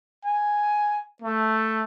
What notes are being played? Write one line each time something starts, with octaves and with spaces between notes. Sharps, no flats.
G#5
A3